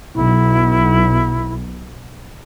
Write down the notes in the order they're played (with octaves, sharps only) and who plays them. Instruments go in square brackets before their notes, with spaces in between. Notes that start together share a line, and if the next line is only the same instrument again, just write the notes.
[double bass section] B1 [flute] E4